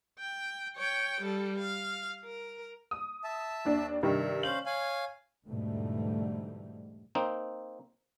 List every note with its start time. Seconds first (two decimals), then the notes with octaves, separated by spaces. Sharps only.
0.19 G5
0.77 C#5 G5
1.21 G3 A4
1.59 F5
2.25 A#4
2.91 D#6
3.24 E5 A5
3.65 D#2 D4
4.03 G2 C3 D#3 E5
4.43 C#4 C5 F5 F#7
4.66 C#5 F5 G#5
5.47 E2 G#2 B2 D3 G3 A3
7.15 A#3 C4 D#4